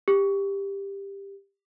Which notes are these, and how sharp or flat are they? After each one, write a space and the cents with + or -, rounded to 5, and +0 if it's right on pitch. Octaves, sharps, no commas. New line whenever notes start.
G4 +15